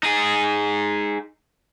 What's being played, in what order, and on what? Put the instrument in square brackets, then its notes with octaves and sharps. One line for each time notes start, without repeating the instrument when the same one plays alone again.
[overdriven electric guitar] D#4 G#4